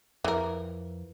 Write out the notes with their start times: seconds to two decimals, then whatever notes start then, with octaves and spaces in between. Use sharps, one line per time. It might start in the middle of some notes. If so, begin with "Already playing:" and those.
0.24 F2 E3 A#4